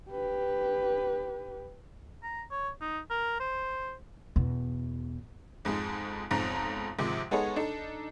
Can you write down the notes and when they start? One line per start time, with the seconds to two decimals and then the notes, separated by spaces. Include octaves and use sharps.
0.10 G4 B4
2.23 A#5
2.51 C#5
2.81 D#4
3.10 A#4
3.40 C5
4.36 E2 B2
5.65 F2 G#2 G#3
6.31 B1 F2 G#2 C4 A#5
6.99 G#2 C3 D#3 F3 G#3
7.31 G#3 B3 D#4 G#4 A4 C#5
7.56 D4 D#4 A4